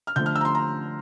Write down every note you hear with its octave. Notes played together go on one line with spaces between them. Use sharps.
F6
D3 F3 A3 G6
F6
E6
A#5
C6
A#5